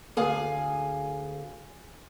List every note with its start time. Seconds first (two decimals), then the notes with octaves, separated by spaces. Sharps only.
0.17 D2 G#4 F5 G#5